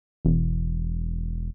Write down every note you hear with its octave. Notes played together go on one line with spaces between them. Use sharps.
E1